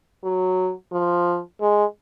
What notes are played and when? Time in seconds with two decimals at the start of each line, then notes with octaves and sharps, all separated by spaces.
0.23 F#3
0.92 F3
1.61 G#3